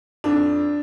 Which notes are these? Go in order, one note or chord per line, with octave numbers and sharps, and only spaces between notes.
F2 D4